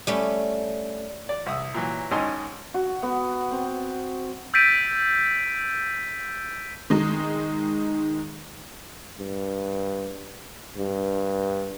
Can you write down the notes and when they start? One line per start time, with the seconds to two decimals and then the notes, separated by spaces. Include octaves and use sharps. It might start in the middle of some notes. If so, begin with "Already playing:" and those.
0.07 G3 A3 C#4
1.29 D5
1.46 C2 E5 D#6 E6
1.74 A#2 E3 F#3
2.11 G#1 G#2 D#3 C#4 D#5 C6
2.74 F#4
3.03 B3
3.51 C4
4.54 E6 G6 A6 B6 D7 D#7
6.90 D#3 G#3 D#4
9.19 G2
10.77 G2